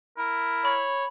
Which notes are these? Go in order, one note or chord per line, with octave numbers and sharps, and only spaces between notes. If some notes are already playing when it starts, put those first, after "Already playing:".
E4 A#4
C#5 B5